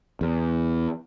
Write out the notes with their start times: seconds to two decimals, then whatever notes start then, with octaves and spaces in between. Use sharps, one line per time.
0.21 E2